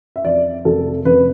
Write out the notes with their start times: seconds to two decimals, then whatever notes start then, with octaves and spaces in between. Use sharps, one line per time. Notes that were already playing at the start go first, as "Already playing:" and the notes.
0.16 E5
0.24 F2 D5
0.65 F1 A4
1.05 F1 B4